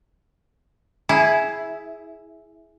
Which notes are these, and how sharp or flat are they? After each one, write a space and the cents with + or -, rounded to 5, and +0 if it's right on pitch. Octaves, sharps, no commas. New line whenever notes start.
E4 -5 G#4 +10